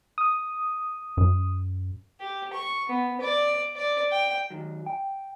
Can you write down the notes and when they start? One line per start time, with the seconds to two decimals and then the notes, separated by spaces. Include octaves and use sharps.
0.18 D#6
1.17 F#2
2.21 G4
2.53 C#6
2.89 B3
3.21 D5
3.77 D5
4.12 G5
4.50 D#3 F#3
4.86 G5